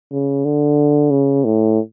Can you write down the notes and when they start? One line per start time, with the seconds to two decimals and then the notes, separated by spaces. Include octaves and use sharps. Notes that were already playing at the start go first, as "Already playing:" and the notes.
0.11 C#3
0.45 D3
1.10 C#3
1.45 A2